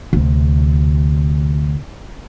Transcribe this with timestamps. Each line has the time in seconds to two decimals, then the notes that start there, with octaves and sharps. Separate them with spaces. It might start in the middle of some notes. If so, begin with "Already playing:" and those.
0.13 D2 C3